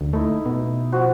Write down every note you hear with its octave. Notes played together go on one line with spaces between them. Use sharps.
D2
A3 D#4 E4
B2
F3 F#4